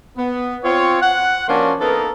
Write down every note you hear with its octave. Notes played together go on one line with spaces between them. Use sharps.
B3
C4 F4 C#5
F#5
F3 A#3 C#4 D4 F#4 C6
A#3 B3 D#4 A4 A#4